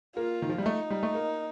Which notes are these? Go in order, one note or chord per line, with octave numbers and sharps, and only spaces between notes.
A#3 F4
D#3
F3
G3
A3 D#4
G3
A3
A#3